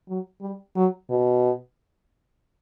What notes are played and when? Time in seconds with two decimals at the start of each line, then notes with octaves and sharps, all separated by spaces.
0.09 F#3
0.41 G3
0.76 F#3
1.10 B2